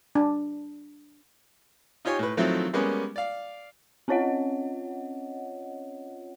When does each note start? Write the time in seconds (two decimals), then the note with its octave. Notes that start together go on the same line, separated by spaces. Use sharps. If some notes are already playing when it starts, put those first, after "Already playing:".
0.15 D4
2.05 D#4 F4 G4 C#5 G#5
2.19 A2 B4
2.37 D#3 F3 F#3 A3 C4 E4
2.73 G3 G#3 A#3 B3 C#4 B4
3.16 D5 F5
4.08 C4 C#4 F4 C#5 D#5 F#5